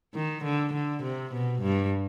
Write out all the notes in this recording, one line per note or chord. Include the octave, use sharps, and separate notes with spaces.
D#3
D3
D3
C3
B2
G2